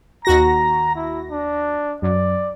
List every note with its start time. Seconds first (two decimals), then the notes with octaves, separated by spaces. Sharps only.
0.25 D#2 F#4 A#5 A#6
0.96 E4
1.31 D4
2.02 F#2 D5